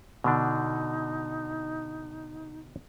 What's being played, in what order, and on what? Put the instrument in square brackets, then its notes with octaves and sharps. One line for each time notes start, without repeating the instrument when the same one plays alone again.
[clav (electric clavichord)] B2 D3 D4 [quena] D#4